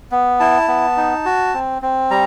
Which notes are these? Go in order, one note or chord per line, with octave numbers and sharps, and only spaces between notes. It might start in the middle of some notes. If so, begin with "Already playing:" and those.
B3
E4 A5
B3
D#4
F#4
C4
C4
G3 A#5